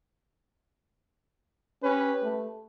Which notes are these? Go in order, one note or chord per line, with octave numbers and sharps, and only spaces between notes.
C#4 G4 B4
A3